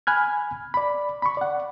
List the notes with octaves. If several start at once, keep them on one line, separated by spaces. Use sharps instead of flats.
G#5 B5 F6 F#6 G#6
D5 B5
B5 C#6
D5 F#5